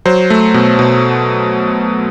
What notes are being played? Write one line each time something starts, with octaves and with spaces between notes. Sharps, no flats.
F#3 C5
A3
B2
B2